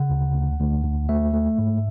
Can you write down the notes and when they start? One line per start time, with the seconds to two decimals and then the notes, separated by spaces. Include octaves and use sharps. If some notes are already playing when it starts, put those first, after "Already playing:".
Already playing: C#3 F#5
0.10 D2
0.35 D2
0.59 D2
0.84 D2
1.09 A3 E5
1.34 A3
1.58 G#2